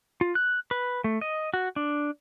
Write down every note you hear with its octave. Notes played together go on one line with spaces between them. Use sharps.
F4
F#6
B4
A3
D#5
F#4
D4